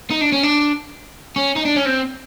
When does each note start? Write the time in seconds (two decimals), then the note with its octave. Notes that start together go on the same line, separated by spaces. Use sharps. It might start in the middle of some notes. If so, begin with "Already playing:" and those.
0.10 D#4
0.21 D4
0.32 C#4
0.43 D4
1.36 C#4
1.56 D#4
1.65 D4
1.76 C#4
1.86 C4